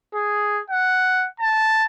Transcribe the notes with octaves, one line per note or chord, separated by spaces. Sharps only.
G#4
F#5
A5